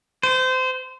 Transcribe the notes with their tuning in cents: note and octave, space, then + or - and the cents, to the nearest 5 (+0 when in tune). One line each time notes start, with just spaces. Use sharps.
C5 -25